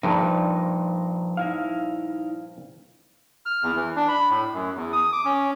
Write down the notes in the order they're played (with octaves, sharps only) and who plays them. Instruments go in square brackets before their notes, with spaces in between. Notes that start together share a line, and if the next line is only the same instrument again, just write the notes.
[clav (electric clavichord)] A#1 G2 A#2 [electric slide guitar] F3 D#4
[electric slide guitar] D#4 E4 F5
[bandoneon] F6
E2
E3
D4
B5
A2
F#2
E2
D#6
D6
C#4